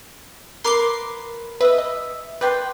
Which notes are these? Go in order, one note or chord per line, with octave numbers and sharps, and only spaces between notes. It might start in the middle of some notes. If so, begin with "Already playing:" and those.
A#4 B4 C6 D6 C7
B4 D#5 E5
D#5
B4 D5 G5 C6